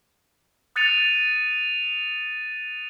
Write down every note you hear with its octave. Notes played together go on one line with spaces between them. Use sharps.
D#6 F#6 A6 C#7 D#7 F7